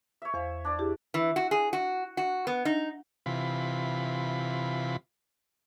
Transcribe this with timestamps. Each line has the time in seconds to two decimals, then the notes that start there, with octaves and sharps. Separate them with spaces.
0.22 C#5 E5
0.34 E2 C5 F5
0.65 D4 D5
0.79 E4 G4 G#4
1.14 E3
1.36 F#4
1.51 G#4
1.73 F#4
2.17 F#4
2.47 B3
2.65 D#4
3.26 C3 E3 F4 B5